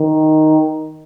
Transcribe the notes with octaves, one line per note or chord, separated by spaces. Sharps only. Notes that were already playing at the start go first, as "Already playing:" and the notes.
Already playing: D#3